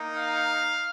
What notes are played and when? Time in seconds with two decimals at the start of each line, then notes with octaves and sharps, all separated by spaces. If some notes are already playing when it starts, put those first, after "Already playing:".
Already playing: A#3 D#4
0.17 F5